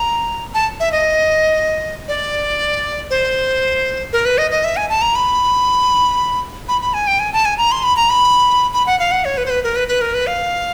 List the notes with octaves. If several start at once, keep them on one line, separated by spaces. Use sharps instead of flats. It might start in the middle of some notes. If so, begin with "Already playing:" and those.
Already playing: A#5
A5
E5
D#5
D5
C5
A#4
B4
D#5
D#5
E5
G#5
A5
A#5
B5
B5
B5
G#5
G5
G#5
A5
G#5
A#5
C6
B5
A#5
B5
B5
F#5
F5
F#5
C#5
B4
C5
B4
A#4
B4
B4
A#4
B4
F5